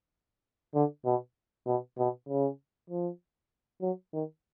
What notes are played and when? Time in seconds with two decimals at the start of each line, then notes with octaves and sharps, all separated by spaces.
0.74 D3
1.06 B2
1.67 B2
1.98 B2
2.29 C#3
2.90 F3
3.82 F#3
4.13 D#3